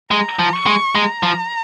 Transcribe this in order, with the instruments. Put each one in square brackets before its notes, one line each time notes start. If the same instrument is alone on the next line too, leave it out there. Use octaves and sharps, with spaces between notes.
[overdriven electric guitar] G#3 [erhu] A#5
[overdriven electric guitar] F3
[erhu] C#6
[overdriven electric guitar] G#3
[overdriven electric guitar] G#3 [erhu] A#5
[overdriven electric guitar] F3